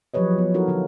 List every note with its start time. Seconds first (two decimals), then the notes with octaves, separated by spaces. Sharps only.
0.14 F3 F#3 G4 B4 C#5 D#5
0.38 B3
0.54 D#4 E4 F#4 A4 A#4
0.68 D3 F4 F#4